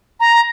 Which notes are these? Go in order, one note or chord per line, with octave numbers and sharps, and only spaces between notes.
A#5